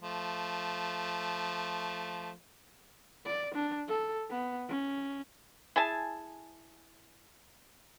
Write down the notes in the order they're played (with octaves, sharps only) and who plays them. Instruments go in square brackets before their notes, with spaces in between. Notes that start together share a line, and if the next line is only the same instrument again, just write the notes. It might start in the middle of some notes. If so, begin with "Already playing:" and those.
[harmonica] F3 A3
[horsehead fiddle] D5
D4
A4
B3
C#4
[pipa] E4 G#4 G#5 A5